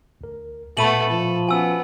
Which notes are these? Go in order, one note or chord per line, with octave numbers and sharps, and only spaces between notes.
D2 A#4
A#2 A3 B3 B5 D#7 F#7
F3 A4
B3 C#4 F#4 G#5 E6